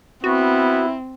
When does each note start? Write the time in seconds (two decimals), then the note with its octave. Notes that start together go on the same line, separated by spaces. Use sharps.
0.24 B3 C4 E4 F#4